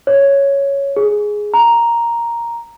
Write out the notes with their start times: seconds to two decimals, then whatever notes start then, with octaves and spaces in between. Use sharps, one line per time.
0.07 C#5
0.96 G#4
1.54 A#5